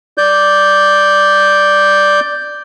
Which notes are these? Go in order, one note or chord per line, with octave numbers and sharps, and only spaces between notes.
D5 G6